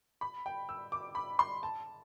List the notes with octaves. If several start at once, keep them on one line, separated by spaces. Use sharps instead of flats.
B5
G5
E6
D6
B5
C6
A5